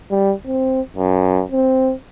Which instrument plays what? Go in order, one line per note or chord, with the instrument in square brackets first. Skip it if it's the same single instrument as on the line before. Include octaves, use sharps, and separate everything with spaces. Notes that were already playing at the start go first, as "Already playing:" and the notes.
[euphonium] G3
C4
F#2
C4